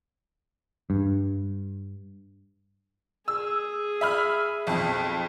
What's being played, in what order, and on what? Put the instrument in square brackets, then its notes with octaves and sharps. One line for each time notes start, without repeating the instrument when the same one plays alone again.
[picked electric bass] G2
[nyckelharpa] G#4 [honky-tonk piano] E6
[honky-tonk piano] E5 B5 F6
B1 F2